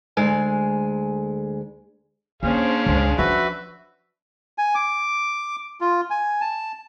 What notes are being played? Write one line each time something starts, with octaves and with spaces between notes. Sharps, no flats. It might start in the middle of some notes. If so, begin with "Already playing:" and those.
D2 G#3 G#5
A#3 C#4 D4 G#4 C5 F5
C#2 F#2
F3 F#4 B4 E5
G#5
D6
F4
G#5
A5